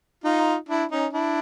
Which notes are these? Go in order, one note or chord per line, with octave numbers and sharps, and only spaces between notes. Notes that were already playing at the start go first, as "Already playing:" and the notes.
D#4 F4
D4 E4
C#4 D#4
D4 E4